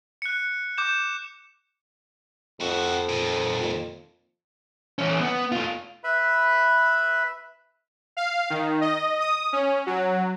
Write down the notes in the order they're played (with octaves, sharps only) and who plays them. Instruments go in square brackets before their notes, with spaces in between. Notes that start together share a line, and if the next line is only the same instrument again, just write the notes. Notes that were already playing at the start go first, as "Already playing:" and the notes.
[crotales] F#6 C#7
D6 G6 E7
[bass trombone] F2 [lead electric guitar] C4 F#4
[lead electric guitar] D#2 A#2
E3 C#4
B3
A3 F4
[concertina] B4 E5 B5
[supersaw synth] F5
D#3
D#5
D#6
C#4
F#3